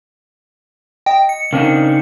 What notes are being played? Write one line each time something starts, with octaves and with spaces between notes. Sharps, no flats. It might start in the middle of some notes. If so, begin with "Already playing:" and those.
D#5 G5
C#7
C#3 C4 D4 D#4 A#4